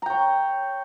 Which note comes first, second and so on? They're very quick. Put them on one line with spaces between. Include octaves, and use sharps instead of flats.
A#5 G5 C#5